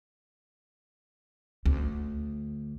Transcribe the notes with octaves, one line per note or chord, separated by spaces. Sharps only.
D2